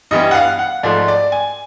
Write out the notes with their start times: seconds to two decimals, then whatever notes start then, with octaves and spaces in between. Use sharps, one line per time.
0.11 G2 E3 G3 B3 D#5
0.31 F#5
0.35 F5
0.59 F#5
0.83 G#2 F3 A3 D5
1.08 D5
1.32 G#5